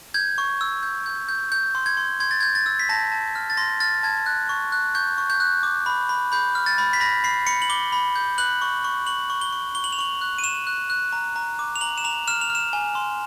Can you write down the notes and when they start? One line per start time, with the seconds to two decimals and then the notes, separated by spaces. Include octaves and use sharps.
0.14 G6 G#6
0.38 C#6
0.61 E6
0.83 G6
1.06 G6
1.29 G6
1.52 G6
1.75 C6
1.86 G#6
1.97 C6
2.20 C6 G#6
2.31 A6
2.41 G6 G#6
2.55 A6
2.66 E6
2.79 B6
2.89 A5 A#6
3.12 A5
3.35 F6
3.50 A6
3.57 C6 A#6
3.80 F6 A6
4.03 A5 G#6
4.26 F#6
4.49 C#6
4.72 F#6
4.95 C#6 G6
5.18 C#6
5.30 G6
5.40 F#6
5.63 D6
5.86 B5
6.09 B5
6.32 B5 G6
6.55 F6
6.66 A6
6.78 B5
6.93 B6
7.00 B5 A#6
7.24 B5 C7
7.47 B5 C#7
7.62 F#7
7.69 D6 G7
7.92 B5
8.16 G6
8.38 F#6 F#7
8.62 C#6
8.85 C#6
9.07 C#6 F#7
9.30 C#6
9.41 G7
9.53 C#6
9.75 C#6 G7
9.84 F#7
9.92 F7
9.99 C#6 F#7
10.21 F#6
10.38 D#7
10.44 C#6 E7
10.67 F#6
10.90 F#6
11.13 A#5
11.36 A#5
11.59 D6
11.76 F7
11.81 A#5 F#7
11.98 E7
12.04 A#5 F7
12.28 F6 E7
12.41 F7
12.50 F6 E7
12.73 G#5
12.95 C6